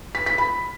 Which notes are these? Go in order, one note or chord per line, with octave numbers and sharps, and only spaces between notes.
B6
B6
B5